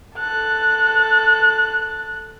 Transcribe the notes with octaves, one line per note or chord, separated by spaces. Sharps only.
A4 F#6